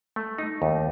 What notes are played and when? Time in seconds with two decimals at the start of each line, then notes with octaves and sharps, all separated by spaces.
0.16 A3
0.38 D#4
0.62 D#2